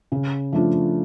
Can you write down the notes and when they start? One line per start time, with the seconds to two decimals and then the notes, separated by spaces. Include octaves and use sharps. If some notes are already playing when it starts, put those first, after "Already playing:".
0.12 C#3
0.53 F3 A3 D4 F4